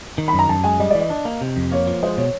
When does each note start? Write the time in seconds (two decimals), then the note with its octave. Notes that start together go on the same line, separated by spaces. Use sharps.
0.18 D#3
0.28 B5
0.33 F#2
0.39 A#5
0.49 F#2 A5
0.64 G#3 G#5
0.80 G3 D#5
0.90 D5
0.95 E3
1.00 D#5
1.10 D4
1.25 A#3
1.41 C3
1.57 F2
1.72 A#3 C#5
1.87 F3
2.03 G#3 C5
2.17 B2 C#5